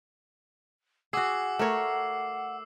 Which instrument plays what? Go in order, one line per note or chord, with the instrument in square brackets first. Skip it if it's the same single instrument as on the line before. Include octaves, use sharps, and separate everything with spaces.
[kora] F#4 G#4 [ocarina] F#5 [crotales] D6 E6 C7
[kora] A3 A#4 C#5